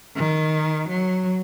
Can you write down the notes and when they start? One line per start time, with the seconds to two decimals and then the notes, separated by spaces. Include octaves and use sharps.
0.16 D#3
0.88 F#3